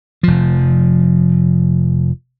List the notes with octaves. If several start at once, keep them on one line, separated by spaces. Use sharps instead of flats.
F1 F3